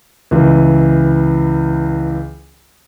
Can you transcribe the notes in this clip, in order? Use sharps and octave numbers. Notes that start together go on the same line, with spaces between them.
C#2 E3